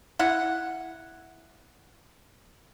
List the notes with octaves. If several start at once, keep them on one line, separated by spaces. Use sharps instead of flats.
E4 F#5